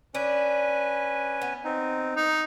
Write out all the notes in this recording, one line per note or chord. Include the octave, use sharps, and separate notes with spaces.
C#4 D4 B4 G#5
B3
C4 D#4
D#4